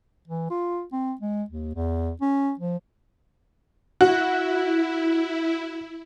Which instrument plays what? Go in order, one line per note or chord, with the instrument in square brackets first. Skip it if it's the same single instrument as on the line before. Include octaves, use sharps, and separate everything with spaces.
[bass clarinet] E3
F4
C4
G#3
D#2
E2
C#4
F3
[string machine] E4 [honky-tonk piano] F#4